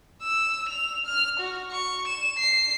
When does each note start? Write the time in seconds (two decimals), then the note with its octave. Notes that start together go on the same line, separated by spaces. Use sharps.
0.22 E6
0.69 F7
1.06 F6
1.40 F#4
1.71 C#6
2.08 E7
2.38 C7